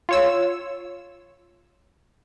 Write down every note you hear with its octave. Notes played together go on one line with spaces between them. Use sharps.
F4 C#5 E6